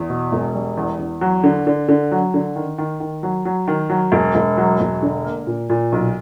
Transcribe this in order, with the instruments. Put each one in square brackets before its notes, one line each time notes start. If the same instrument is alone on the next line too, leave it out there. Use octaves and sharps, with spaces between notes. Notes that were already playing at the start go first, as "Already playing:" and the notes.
Already playing: [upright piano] E2
B2
E1
G3
E2
E2
F#3
D3
D3
D3
F#3
D3
D#3
D#3
D#3
F#3
F#3
D#3
F#3
E1
E1
F#3
E1
D3
A#3
A#2
A#2
B1